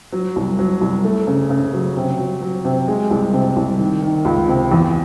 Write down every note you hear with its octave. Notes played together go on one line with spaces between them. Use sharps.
F#3
C2
F#3
C2
A3
C#3
C#3
F#3
C3
F#3
F#3
C3
G#3
C2
C3
C2
D#3
D#3
C#2
C3
E2